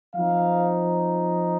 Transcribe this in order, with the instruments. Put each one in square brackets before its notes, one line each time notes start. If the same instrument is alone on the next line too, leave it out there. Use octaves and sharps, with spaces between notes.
[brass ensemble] F3 C4 D#4 F5